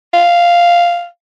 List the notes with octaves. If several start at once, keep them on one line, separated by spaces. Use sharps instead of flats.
F5